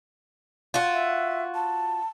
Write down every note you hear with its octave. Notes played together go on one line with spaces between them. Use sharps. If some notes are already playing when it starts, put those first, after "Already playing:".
F4 F#4
E5
A5